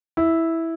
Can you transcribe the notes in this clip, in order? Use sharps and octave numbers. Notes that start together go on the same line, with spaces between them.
E4